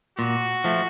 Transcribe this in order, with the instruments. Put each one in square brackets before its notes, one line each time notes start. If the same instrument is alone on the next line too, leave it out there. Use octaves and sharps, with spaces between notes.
[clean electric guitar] A#2 [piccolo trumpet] F#4
[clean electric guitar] F3 A3